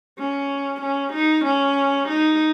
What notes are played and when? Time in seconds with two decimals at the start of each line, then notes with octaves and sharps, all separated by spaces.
0.19 C#4
0.81 C#4
1.13 D#4
1.45 C#4
2.08 D#4